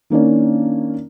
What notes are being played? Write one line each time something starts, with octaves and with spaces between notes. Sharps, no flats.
D#3 A#3 C#4 D4